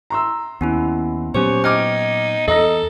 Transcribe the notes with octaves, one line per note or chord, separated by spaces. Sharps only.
A#5 C6 E6
D#2 B3 C#4 E4
A#2 F#3 B3 C#4 G4 C5 C#5
D#4 G5 D6 F6 G#6
E2 A4 D#5 A#5 A#6